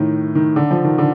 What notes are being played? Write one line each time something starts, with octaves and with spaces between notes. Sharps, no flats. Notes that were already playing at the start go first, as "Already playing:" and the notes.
Already playing: A2 D#3
D#3
D3
F3
D#3
D3